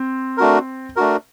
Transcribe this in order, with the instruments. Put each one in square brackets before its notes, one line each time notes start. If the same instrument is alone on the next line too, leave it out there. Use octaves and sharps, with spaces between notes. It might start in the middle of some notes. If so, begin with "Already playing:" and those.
Already playing: [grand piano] C4
[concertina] A3 D4 F#4 A#4
A3 D4 F#4 A#4